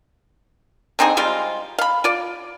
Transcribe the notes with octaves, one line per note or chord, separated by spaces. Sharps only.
D3 C4 D#4 G#4
G3 G#3 C4 F4
F5 B5
F4 D5